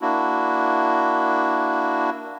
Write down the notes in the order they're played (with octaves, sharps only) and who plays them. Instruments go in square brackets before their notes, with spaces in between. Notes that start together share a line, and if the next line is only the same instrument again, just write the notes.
[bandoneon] A#3 D4 E4 F#4